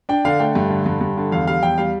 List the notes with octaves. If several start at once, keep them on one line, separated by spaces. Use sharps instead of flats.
D4 G5
D3 F5
A3 G5
G2
D3
G2
G2
D3
E2 F5
G3 F5
E2 G5
G3 F5